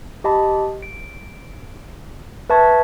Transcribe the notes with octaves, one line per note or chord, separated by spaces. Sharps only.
G4 D#5 A5 B5
D7
B4 E5 A5 C#6 G#6